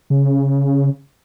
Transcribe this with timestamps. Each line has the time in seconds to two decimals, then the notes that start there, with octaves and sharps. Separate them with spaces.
0.10 C#3